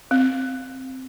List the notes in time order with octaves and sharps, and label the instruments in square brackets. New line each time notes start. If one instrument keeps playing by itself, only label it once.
[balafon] C4